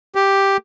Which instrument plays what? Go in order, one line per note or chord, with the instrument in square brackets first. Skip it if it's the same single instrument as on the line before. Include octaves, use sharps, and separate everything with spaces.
[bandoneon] G4